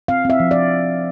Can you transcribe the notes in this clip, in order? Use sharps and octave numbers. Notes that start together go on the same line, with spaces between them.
C4 F5
C4 E5
F3
D5